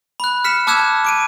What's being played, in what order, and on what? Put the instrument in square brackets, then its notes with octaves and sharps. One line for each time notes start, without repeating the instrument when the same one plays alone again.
[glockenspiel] B5 F#6
F6 B6 C#7 E7
A5 D6 E6 F#6 G#6 E7
D6 D7 D#7